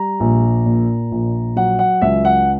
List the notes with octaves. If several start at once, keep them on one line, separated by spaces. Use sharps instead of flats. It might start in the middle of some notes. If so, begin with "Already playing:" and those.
Already playing: G3 A#5
A#1
A#2
A#1
F#3 F#5
F#5
C#2 E5
F#5